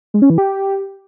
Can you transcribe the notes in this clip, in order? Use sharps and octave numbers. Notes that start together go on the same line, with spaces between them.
G#3
C#4
E3
G4